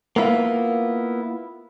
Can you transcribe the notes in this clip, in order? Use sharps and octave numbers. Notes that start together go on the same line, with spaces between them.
A#3 B3 E4 F4